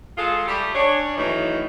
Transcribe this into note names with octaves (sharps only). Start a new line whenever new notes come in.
G#3 F4 G#4 A4
G3 A3 G4
C#4 D4 C#5
D#3 E3 F#3 A3 D#4